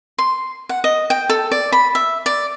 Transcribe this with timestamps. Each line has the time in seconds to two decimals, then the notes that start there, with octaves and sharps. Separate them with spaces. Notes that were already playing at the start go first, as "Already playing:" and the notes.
0.18 C6
0.69 F#5
0.84 D#5
1.10 G5
1.29 A4
1.52 D5
1.72 B5
1.95 E5
2.26 D5